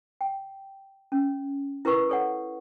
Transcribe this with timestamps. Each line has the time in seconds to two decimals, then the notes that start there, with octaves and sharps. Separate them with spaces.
0.21 G5
1.12 C#4
1.85 E4 A#4 B4 C#6 E6
2.09 A4 C#5 F#5